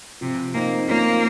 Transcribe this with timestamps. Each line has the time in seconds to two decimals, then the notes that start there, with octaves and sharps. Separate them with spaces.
0.21 C3 F3
0.54 A#3 C4 D#4
0.88 A#3 C#4 F4